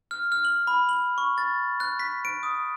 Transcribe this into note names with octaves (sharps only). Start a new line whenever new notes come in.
F6
F6
F#7
B5
F#7
C#6
A6
F#6
B6
D7
D#6